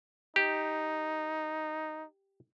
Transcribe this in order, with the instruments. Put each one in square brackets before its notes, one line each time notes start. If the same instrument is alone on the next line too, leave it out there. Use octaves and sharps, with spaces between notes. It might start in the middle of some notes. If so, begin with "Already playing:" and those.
[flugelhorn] D#4 [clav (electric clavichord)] G4